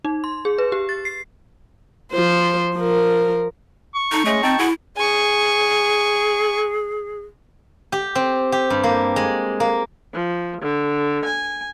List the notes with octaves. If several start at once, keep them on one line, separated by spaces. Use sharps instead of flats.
D#4
C6
G#4
B4
G4
A6
C7
F3 C5
F3 A#4
C#6
D#4 A4
G#3 A3 C#4 D#5
C4 D#4 G5 A5
E4 F#4 G#4
G#4 G#5 C#6
G4
C4
G4
G2
A#3
G#3
A#3
F3
D3
G#5